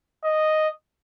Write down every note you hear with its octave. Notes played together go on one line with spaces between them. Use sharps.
D#5